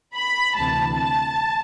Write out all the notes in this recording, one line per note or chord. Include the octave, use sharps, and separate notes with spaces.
B5
D2 C3 E3 A5
A5